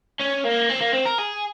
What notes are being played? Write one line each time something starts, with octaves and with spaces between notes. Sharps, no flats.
C#4
A#3
C4
A#3
C4
A#4
G#4